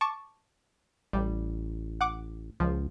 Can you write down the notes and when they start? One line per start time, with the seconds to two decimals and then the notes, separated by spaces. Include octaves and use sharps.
0.01 A5 C#6 D6
1.13 A1 G3
2.01 F#5 D6
2.60 C#2 F3